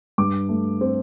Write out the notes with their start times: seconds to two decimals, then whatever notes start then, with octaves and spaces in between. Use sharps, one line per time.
0.18 G2 D6
0.49 A3
0.81 C4